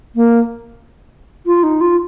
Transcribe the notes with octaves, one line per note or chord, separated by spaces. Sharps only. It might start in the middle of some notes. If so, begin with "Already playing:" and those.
A#3
F4
D#4
F4